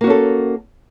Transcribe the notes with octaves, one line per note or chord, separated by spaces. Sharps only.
A#3 C#4 F#4 A4